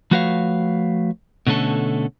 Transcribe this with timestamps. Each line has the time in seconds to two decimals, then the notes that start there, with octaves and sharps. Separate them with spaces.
0.11 F3 A3 F#4 B4 C#5 F5
1.47 B2 D3 A3 C#4 A4